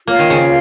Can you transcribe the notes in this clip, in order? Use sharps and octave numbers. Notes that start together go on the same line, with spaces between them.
A#3 F4 A#4 C#5 F5
D#3
C#3